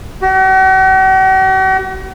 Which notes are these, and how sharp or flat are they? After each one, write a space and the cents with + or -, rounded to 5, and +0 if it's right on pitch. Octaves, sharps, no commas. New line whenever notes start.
F#4 +45